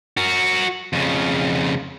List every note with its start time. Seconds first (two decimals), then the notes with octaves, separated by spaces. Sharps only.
0.17 F#4 A#4
0.93 F2 C#3